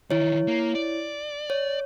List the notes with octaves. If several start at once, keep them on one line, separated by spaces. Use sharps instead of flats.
D#3 E3 E4 C#5
A#3
D5
C#5